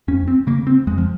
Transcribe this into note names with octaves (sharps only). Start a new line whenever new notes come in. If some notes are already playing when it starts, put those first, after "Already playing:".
F2 C#4
C4
C#3 A#3
C4
F2 G#3
F3